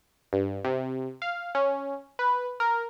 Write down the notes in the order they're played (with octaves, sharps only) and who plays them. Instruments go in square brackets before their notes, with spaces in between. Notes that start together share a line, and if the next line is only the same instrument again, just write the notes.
[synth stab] G2
C3
F5
C#4
B4
A#4